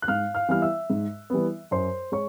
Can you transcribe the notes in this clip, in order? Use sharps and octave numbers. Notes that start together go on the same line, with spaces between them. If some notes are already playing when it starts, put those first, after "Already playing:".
F#6
G#2 F5 F6
F5 F6
E3 G3 B3 F6
E5 E6
G#2
E3 G3 B3
F#2 C5 C6
G#3 C#5 C#6